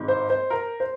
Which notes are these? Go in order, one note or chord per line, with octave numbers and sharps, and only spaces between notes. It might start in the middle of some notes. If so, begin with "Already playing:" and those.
Already playing: G#1 G#2
C5
C5
A#4
C5